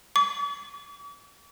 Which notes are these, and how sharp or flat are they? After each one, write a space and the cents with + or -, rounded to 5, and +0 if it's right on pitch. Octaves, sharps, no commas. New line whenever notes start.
D6 -45